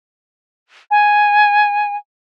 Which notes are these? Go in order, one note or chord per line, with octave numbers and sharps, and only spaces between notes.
G#5